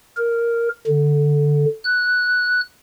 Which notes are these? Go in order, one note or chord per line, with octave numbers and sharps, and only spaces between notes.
A#4
D3
F#6